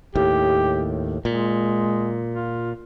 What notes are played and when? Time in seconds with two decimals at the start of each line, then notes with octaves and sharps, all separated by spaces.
0.15 D#2 A2 G4
1.25 A#2 G#3
2.34 F4